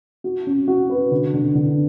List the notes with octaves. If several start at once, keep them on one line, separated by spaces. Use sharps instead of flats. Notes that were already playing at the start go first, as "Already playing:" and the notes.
F#4
C#4
F#4
B4
D3
D3
D3